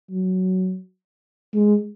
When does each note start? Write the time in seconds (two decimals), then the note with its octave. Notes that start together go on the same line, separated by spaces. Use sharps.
0.11 F#3
1.54 G#3